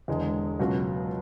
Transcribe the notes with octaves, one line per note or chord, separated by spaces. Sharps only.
E1 E2 D3 G#3
C#2 B2 F#3 C#4 F#4